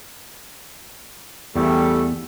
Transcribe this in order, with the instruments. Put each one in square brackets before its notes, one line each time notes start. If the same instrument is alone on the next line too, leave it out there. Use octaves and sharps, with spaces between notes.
[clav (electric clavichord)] E2 [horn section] G3 A3